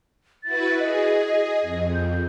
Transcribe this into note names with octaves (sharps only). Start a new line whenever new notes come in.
E4 F#4 B4 A6
G#4 D#5
F2
G6